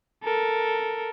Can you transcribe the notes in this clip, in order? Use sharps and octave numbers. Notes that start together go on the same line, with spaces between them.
A4 A#4